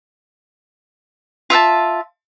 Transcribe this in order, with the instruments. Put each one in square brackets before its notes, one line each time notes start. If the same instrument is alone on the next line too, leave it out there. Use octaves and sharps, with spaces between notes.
[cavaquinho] F4 E5 F#5 A5